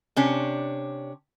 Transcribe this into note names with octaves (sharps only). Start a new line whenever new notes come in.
C3 C#4 D4